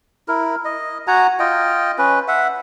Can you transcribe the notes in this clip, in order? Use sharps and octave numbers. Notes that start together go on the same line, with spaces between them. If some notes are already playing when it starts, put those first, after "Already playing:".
E4 A#4
D#5
F#4 F#5 G#5 A#5
F4 D#5 G5
C#4 B4
E5 F#5